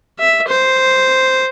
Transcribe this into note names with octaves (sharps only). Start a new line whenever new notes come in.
E5
C5